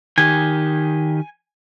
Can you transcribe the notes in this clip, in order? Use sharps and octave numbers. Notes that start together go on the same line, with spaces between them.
D#3 G4 G#5